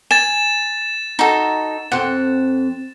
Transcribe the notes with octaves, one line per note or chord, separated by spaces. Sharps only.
G#5 A6 E7
D#4 F#4 A4
F2 C4 F#5